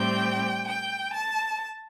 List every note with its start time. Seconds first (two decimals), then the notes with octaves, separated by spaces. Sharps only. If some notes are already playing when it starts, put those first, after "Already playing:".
Already playing: A2 G3 C4 G5
0.67 G5
1.13 A5